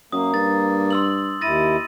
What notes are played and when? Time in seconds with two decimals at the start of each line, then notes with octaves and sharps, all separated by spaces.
0.12 F#2 A#3 D#6
0.34 G2 A6
0.91 C6 E6 F#7
1.41 D#2 E4 A6 A#6 D#7